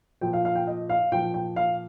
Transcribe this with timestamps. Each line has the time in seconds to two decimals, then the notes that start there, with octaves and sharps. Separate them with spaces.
0.21 A#2 F3 G5
0.33 F5
0.45 F5
0.55 G5
0.67 D#5
0.89 F5
1.12 A#2 F3 G5
1.34 G5
1.56 F5